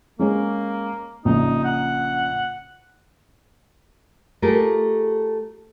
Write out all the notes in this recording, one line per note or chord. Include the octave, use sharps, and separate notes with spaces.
G#3 A#3 C#4 G#4
A#1 C#3 D#4
F#5
A3 F4 G4 G#4 A#4